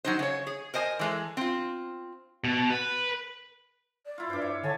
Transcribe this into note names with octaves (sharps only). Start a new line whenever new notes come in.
F#3 D#4 C5
C#3 C#5
G#4
A#4 C5 D#5 G#5
E3 G#3 A4
C4 F4
B2
B4
D5
E4 F4
G2 C5 D6
C#5
D3 C#5 G#5 A5